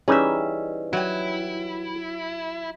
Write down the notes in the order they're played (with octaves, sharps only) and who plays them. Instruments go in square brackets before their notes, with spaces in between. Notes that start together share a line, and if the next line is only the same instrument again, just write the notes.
[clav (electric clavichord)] E3 G3 D#4 [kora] C#4 E5 [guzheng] G#4
[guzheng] F#3 G5 [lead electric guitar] E4